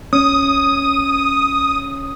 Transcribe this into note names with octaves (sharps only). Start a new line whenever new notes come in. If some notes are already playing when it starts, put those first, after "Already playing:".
C#4 D#6